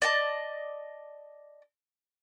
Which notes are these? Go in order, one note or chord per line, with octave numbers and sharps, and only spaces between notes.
D5 D#5 A5